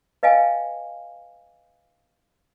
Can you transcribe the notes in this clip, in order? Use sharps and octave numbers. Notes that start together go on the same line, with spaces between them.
B4 D#5 F5 G5 G#5